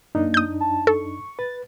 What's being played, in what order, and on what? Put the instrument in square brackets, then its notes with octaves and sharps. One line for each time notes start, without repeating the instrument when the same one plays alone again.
[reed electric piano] F#2 D4 D#4 [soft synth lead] A#3
[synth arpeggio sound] D#6 G6
[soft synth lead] A5
[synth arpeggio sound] A4 [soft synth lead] C#6
[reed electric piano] B4 [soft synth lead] A6